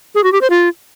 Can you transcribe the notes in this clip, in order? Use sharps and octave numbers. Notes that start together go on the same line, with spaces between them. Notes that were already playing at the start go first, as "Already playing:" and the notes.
G#4
F#4
G4
C5
F4